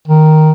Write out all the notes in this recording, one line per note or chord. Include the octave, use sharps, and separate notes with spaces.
D#3